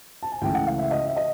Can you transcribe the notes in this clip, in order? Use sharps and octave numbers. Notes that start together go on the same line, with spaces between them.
A5
G#5
C#2 C#3 E3 A3 G5
F#5
F5
E5
D#5
E5
D#5